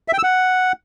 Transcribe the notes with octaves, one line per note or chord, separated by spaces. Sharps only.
E5
G5
E6
F#5